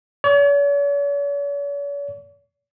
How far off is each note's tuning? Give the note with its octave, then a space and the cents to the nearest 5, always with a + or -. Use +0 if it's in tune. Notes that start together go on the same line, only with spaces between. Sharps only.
C#5 +45